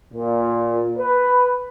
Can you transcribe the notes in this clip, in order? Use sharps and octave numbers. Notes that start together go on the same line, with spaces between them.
A#2
B4